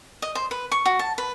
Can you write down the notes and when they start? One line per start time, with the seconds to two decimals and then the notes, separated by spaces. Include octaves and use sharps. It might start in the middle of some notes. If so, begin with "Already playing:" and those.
0.22 D#5
0.35 C5
0.51 B4
0.72 C#6
0.86 F#4
0.99 A5
1.18 B4